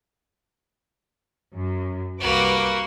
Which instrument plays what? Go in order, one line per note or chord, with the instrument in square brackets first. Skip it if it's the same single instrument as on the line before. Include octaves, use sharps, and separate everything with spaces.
[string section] F#2
[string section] C2 B4 D6 [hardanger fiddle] A#3 F#4